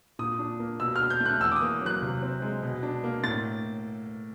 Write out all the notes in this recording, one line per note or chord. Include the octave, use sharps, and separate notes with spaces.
A#2 D#6
D4
A#3
B2 E6
D4 F6
G6
A3
F#6
E2 E6
D6
D#6
A#3
F#3 F#6
C3
C4
G#3
B2
D4
A#3
A2 A6